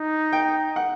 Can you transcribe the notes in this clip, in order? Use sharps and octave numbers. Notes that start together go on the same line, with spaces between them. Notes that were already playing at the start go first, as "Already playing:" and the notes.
Already playing: D#4
G5
F#5